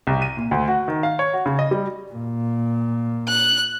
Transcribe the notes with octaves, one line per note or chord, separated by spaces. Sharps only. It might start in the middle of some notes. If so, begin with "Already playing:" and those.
C2
D#7
A#2
D2
F#4
D#3
F5
C#5
F#4
C#3
D#5
G3
A#2
F#6